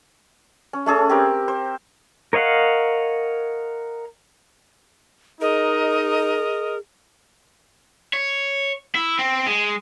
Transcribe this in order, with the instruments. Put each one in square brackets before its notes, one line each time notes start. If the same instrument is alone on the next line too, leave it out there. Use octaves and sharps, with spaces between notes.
[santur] C#4
A3 C#4 G#4 A4
C4 G4 A#4
C5
[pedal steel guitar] A#4 C#5 D#5 F5 F#5
[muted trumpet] D#4 [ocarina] G#4 [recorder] A#4 [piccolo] D#5
[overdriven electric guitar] C#5
E4
C4
G#3